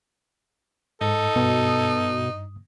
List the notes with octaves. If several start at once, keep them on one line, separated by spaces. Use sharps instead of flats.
G#2 D#4 A4
G2 B2 D#6